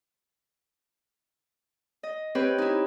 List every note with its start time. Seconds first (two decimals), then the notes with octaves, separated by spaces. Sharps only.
2.03 D#5
2.35 C4 G4 B4 C#5
2.58 D#4 E4